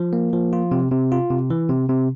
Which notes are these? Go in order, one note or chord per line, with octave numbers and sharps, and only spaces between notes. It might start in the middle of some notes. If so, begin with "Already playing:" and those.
Already playing: F3
A#3
F3
F4
C3
C3
F4
C3
E3
C3
C3